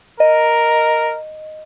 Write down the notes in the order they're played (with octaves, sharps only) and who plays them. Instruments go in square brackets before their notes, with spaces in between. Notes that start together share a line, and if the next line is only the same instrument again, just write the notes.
[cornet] A#4 [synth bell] D#5